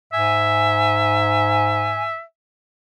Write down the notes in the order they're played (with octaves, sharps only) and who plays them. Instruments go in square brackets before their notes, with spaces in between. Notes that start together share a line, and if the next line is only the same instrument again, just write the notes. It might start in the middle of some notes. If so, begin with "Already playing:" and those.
[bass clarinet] G#2 [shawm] E5 [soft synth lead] G#5